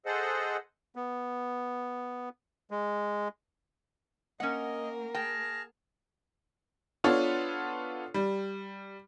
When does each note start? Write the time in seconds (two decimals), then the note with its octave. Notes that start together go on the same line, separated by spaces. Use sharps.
0.06 G#4 A4 C5 D#5 F#5
0.96 B3
2.71 G#3
4.40 A#3 C#4 A#4 D#5 F#5
5.15 G#4 G5 A5 F6 A#6
7.04 B3 D4 F4 A4 C#5
8.14 G3